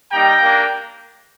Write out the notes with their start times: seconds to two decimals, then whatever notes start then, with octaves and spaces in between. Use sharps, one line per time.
0.12 G3 A#3 D#4 G4 G5 A#5
0.41 A#3 D4 G4